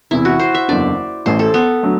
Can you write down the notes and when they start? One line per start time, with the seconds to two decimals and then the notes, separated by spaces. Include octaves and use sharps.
0.11 E2 C3 E3 E4
0.25 F#4
0.39 C5
0.54 E5
0.68 F#1 E2 D3 D5
1.26 A1 A2 E3 C5
1.39 A4
1.54 B3
1.83 D3 F#3 A3